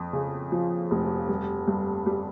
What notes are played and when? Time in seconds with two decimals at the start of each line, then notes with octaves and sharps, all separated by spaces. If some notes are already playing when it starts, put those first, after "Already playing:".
Already playing: F2
0.13 C#3
0.52 F3
0.91 F1
1.29 G2
1.68 G2
2.06 G3